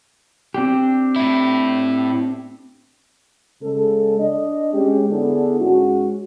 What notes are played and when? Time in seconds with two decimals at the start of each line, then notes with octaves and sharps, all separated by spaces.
0.54 C4 D4 G4
1.16 A2 E4
3.63 C#3 G#3 A4
4.19 D4 D#5
4.73 G#3 C#4 G4
5.10 D3 B3 D4 E4 G#4 A4
5.61 G#2 G#3 C#4 F#4